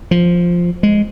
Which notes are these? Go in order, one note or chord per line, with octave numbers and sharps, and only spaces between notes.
F3
G#3